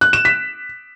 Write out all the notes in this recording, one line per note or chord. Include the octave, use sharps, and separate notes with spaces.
F#6
E7
B6